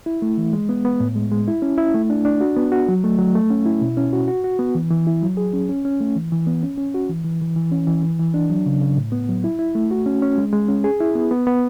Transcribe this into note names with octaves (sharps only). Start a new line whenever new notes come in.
E4
A3
E3
G#3
B3
B3
A2
G#3
G#3
E4
C#4
E4
A3
D4
D4
F#4
B3
F#4
F#3
A3
F#3
A3
C#4
E4
B2
C#4
F#4
F#4
F#4
B3
E3
E3
E4
F#3
G#4
C#4
C#4
C#4
A3
E3
E3
B3
C#4
C#4
F#4
E3
E3
E3
E3
C#4
E3
E3
E3
D4
F#3
C#3
C#3
A2
B3
F#3
E4
E4
A3
F#4
C#4
C#4
G#3
G#3
C#4
G#4
E4
B3
B3
B3